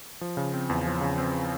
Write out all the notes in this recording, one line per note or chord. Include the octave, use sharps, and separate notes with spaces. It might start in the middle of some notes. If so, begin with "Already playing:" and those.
F3
C#3
C4
E2
F3
C#3
C4